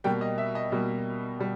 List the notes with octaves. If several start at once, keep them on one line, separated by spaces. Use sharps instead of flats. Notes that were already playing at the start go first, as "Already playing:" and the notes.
B2 G3 A#3 G5
D#5
E5
D#5
B2 G3 A#3
B2 G3